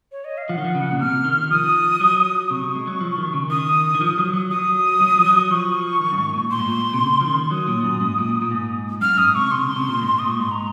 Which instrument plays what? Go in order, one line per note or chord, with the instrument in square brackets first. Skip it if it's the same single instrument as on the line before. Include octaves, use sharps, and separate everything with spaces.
[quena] C#5
D#5
F5
[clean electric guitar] F3 [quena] F#5
[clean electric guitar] D#3
F3
C#3
A#2
[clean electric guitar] C3 [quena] F6
[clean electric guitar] D#3
[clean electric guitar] F3 [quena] D#6
[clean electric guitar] F#3
[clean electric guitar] C3 [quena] C#6
[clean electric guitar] C3
G#3
F#3
F3
D#3
C#3
[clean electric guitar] D#3 [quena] D#6
[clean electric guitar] D#3
F3
F#3
F#3
[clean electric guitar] F#3 [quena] D#6
[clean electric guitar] F#3
F3
F#3
[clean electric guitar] F3 [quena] C#6
[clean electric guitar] D#3
F#2
G#2
A#2
[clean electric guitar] A#2 [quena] C6
[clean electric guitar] G#2
A#2
C3
C#3
F3
D#3
[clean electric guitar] F#3 [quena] D#6
[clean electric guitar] A#2
F#2
G#2
A#2
A#2
G#2
[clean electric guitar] F#2 [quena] F6
[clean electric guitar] G#2 [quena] D#6
[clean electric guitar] C3 [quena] C#6
[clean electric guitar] C3 [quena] C6
[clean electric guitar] C#3
C3
A#2
G#2
[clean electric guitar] G#2 [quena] D#6
[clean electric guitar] A#2 [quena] C#6
[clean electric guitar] G#2 [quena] C6
[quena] A#5